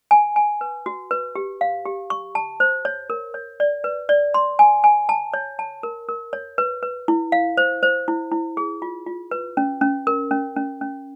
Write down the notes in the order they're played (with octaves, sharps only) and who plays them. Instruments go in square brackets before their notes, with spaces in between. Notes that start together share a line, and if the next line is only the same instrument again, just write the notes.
[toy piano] G#5
G#5
B4
F#4
B4
G4
F5
G4
C#6
A5
C5
C#5
A#4
C#5
D5
B4
D5
C6
G#5
G#5
A5
C#5
A5
A#4
A#4
C#5
B4
B4
E4
F5
C5
C5
E4
E4
G#4
F4
F4
B4
C#4
C#4
A#4
C#4
C#4
C#4